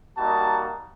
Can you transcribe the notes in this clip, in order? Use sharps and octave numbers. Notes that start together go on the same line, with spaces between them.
G3 A#3 D#4 F#4 A5